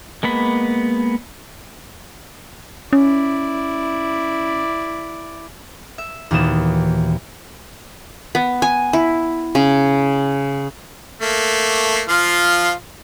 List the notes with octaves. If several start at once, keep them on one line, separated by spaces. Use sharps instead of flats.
G#3 A#3 B3 B5
C#4 E4 D5
E5
D#2 A#2 E3 B3 F#4 E7
B3
G#5
E4
C#3
A3 A#3
F3 F4 F5